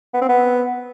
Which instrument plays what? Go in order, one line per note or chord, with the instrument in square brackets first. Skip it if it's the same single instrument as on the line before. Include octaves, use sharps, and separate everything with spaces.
[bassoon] B3
C4
B3